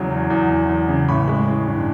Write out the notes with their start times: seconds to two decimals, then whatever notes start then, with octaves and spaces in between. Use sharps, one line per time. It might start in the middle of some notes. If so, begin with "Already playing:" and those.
Already playing: E2 C#3 F#3
0.11 E2
0.30 E2
0.51 E2
0.69 E2
0.88 C#3
1.09 A1 B5 C#6
1.28 G#3
1.48 E3
1.67 G2